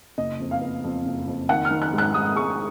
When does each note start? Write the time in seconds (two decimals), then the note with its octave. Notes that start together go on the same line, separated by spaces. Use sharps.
0.18 F#1 D#5
0.40 F2
0.51 F5
0.62 B3
0.84 F2
1.06 F#1
1.27 F2
1.49 D#3 F#5
1.65 F6
1.70 D#3
1.82 F#6
1.93 G#2
1.98 F#6
2.14 G#2 D#6
2.36 G#3 C#6